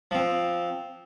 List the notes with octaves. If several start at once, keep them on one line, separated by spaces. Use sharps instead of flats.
F3 C4